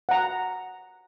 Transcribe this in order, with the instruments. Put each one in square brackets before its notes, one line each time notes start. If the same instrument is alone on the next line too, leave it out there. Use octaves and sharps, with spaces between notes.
[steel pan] F#5 A#5